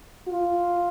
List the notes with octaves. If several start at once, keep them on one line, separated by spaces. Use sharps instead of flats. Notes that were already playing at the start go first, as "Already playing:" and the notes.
F4